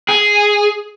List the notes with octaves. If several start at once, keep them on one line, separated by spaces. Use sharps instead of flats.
G#4